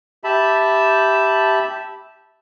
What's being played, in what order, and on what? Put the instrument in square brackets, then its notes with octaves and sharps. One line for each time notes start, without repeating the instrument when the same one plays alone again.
[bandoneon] G4 E5 A5 B5